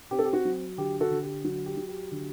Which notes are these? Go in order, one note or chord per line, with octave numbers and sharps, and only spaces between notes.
C4 G4
A4
G4
F#4
F#3
D3 G4
F#4 A4
D3
G4
F#3 F#4
G4
F#3
G4
D3